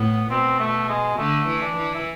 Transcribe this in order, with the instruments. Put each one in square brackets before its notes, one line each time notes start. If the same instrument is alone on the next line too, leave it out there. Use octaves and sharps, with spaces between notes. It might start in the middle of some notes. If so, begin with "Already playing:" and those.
Already playing: [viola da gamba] A2 [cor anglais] B3
[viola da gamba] B2 [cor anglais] C4
[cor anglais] A3
G#3
[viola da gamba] D3 [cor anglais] A3
[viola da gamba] E3
[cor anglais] D4
[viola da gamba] E3
[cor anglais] E4